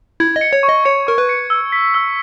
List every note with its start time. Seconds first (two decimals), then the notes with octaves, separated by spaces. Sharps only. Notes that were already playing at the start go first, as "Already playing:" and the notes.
0.20 E4 G#6
0.36 D#5
0.41 C#7
0.53 C#5
0.63 C#6
0.69 D#5
0.85 C#5 C#7
1.07 A#4 C#6
1.18 B4
1.29 C#7
1.50 E6
1.72 B6
1.94 E6